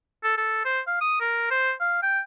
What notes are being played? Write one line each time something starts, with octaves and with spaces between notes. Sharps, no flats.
A4
A4
C5
F5
D#6
A#4
C5
F5
G5